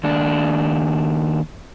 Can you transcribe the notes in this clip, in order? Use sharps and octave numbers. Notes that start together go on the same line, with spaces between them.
D#2 D4